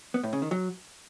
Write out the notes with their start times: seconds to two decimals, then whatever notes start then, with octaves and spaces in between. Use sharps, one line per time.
0.14 B3
0.23 A2
0.33 C#3
0.42 D#3
0.51 F#3